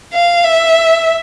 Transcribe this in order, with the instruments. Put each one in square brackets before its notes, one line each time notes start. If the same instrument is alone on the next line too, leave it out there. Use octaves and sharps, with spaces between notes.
[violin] F5
E5